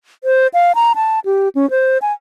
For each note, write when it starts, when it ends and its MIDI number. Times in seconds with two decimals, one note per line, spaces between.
0.24 0.47 72
0.54 0.72 77
0.75 0.93 82
0.96 1.19 81
1.25 1.49 67
1.55 1.69 61
1.70 1.98 72
2.02 2.13 80